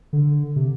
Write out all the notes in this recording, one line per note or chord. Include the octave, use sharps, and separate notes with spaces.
D3
C3